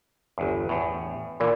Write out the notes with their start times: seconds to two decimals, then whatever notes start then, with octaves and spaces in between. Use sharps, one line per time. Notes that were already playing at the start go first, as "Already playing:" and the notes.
0.38 G1 E2
0.69 E2 A2
1.40 A#2 D3 E3